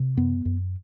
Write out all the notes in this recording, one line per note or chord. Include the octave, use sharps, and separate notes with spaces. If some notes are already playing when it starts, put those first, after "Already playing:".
Already playing: C3
F#2 B3
F#2